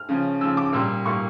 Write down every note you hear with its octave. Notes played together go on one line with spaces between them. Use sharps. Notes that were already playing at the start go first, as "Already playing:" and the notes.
Already playing: F6
C#3 F3 C#4
C#3 F3 C#4 E6
D6
A#2 G3 A#3 E6
A#2 G3 A#3 C#6